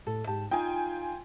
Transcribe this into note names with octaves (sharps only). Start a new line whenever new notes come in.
A2 A4
G#2 G4 A5
D#4 F4 G5 G#5